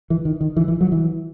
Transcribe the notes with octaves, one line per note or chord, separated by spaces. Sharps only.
E3
D#3
D#3
E3
E3
F#3
E3